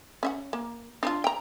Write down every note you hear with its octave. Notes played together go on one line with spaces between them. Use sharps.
C#4 E5 F#5
A#3
D4 D#4 F4
G5 A#5